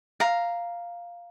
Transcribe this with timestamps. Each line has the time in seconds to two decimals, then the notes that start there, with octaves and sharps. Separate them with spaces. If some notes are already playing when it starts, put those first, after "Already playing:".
0.20 F5 A#5